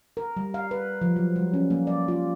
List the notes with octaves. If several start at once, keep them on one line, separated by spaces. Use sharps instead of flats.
A#4
G3
F5
B4
F3
F#3
G3
C#4
A#3
D5
F4